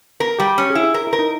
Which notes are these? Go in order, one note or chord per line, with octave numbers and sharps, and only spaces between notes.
B3 A#4
G3 G4
C#4 G4
G#4
E4
G#4
G#4 A#4
E4
A#4
D#4